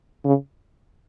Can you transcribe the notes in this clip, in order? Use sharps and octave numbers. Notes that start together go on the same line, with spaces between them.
C#3